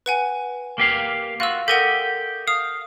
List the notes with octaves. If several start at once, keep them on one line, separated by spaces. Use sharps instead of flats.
B4 F#5 G#5
A#3 G4 F5
F4 F#4 F5 E6
G4 A4 A#4 D#5 F#5
F5 D#6